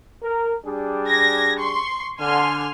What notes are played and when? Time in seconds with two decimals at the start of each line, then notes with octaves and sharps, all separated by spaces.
0.22 A#4
0.65 G3 D4 G#4
1.07 G#6 A#6
1.60 C6 C#6
2.19 D3 G#5 C6 F6